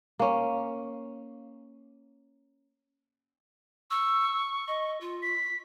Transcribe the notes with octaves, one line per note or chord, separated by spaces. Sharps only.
A#3 C#4
C#6 E6
D#5
F4
B6